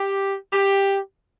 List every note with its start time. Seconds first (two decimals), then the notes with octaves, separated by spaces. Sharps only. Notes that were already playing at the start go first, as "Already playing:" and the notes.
Already playing: G4
0.53 G4